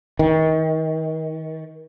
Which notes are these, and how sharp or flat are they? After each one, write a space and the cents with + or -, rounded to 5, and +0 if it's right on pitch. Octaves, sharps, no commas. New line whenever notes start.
D#3 +35